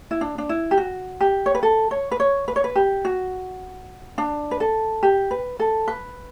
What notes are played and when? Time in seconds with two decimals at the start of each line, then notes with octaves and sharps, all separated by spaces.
0.11 E4
0.21 D4
0.38 D4
0.49 E4
0.71 G4
0.78 F#4
1.21 G4
1.46 C#5
1.55 B4
1.63 A4
1.91 C#5
2.11 B4
2.20 C#5
2.48 B4
2.56 C#5
2.64 B4
2.76 G4
3.05 F#4
4.18 D4
4.51 B4
4.60 A4
5.03 G4
5.31 B4
5.59 A4
5.88 B4